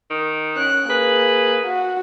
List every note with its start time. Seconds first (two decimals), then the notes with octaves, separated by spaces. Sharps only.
0.10 D#3
0.56 C#4 F#6
0.90 A#3 G#4 B4
1.66 F#4